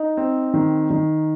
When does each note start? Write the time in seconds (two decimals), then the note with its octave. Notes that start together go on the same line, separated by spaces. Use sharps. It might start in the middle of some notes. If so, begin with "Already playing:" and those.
Already playing: D#4
0.17 C4
0.54 D#3
0.90 D#3